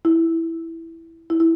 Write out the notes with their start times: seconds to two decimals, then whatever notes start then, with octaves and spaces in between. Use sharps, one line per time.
0.05 E4
1.30 E4
1.40 E4